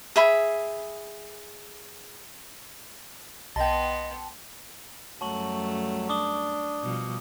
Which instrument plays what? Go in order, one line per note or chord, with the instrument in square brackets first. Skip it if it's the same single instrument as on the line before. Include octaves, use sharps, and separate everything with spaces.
[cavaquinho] G#4 E5 B5
[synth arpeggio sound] B1 [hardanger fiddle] B3 C6 [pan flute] D#5 [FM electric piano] G5 A5
[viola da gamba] F#2 G3 A3 [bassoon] F#3 [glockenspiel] A5 C#6 F#7
[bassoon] D4 [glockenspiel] D6 D#6 G7
[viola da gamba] B2 F3 G3